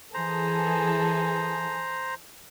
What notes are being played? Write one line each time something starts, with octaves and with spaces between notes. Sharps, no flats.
E3 G#4 A4 C5 A#5